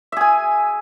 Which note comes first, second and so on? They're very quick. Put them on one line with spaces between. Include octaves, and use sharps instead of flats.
E5 G#4 G#5